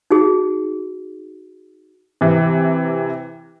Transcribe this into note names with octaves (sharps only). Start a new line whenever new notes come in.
D#4 F#4 G#4
C3 E3